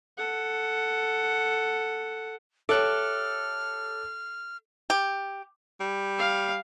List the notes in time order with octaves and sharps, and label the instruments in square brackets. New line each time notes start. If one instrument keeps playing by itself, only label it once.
[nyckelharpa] A4 F#5
[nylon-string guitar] G4 C#5 E5 [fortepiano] A4 [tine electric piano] D6 F#6 [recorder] F6
[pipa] G4
[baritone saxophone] G3
[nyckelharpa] F5